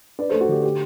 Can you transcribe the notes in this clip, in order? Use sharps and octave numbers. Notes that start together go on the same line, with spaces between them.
D4 B4 D5
A3 A4 C5
F#4 A4
D3 G4
G4